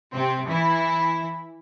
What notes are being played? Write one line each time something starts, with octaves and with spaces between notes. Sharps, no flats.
C3 C4
E3 E4